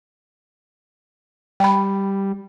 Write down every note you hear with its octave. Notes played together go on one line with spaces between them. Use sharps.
G3 G5 B5